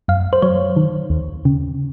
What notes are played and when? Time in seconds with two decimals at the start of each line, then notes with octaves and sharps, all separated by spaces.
0.08 F#2 F5
0.33 C5
0.42 F#3 C#5
0.77 D#3
1.10 D#2
1.45 C#3